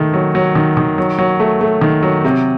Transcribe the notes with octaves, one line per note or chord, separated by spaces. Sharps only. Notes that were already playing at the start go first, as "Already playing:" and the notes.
Already playing: D#3 A3
F#3
F#3
D#3
D#3
F#3
F#3
A3
A3
D#3
F#3
C3